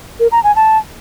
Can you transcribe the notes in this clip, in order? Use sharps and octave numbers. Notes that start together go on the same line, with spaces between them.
A#4
A#5
G#5
A5